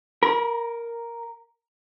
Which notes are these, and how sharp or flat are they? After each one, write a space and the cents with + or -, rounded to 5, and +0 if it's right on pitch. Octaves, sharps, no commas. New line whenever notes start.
A#4 +0 B5 -45